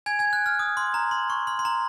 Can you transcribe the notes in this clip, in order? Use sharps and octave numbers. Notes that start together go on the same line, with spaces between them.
G#5 G#6
G#5 G#6
F#6
F6
D#6
C6
A#5
C6
C#6
C6
C6
A#5